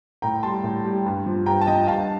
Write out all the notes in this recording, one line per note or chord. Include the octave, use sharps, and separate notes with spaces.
A2 G5 A#5
G3 A5 C6
A2
G3
G2
F3
G2 G5 A#5
A5
F3 D#5 G5
G2 F5 A5